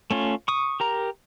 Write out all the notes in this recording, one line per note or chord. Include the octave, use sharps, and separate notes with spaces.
A3 C#4 F4
C#6 D#6
G4 A#4 A#5